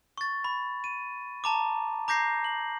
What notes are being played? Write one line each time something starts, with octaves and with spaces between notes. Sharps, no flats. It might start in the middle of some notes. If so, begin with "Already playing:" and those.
C#6 A6
B5
D#7
A5 A#5 D6
A#5 D6 G6 A#6 C7
F#7